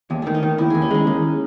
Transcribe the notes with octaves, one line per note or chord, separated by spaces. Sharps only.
D#2 G#3
D#3 A3
D#4
D#3
D#2 E4
D#2 G#4
C#4
G#3 D#4
D#2